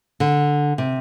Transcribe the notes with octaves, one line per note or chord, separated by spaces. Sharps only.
D3
C3